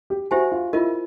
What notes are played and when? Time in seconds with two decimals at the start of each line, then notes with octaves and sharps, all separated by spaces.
0.10 G4
0.31 E4 F#4 G4 C5 E5 G#5
0.52 F4
0.73 E4 F4 A#4 D#5